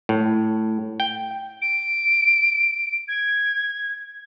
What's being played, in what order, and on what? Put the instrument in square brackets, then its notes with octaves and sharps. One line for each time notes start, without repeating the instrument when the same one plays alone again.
[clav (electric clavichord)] A2
G5
[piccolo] D7
G#6